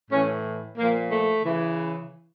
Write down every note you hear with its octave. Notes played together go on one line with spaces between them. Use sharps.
A2 E3 C#4
A#2 F3 A#3
A3
C#3 E3